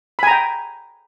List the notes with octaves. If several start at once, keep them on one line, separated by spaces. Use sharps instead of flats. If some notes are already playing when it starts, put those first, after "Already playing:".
G5 G#5 A#5 B5